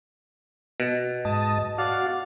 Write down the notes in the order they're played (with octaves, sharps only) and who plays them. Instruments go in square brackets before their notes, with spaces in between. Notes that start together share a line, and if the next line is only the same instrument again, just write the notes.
[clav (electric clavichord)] B2
[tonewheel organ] G#2 D#5 A5
[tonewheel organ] F#4 F5 [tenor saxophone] D5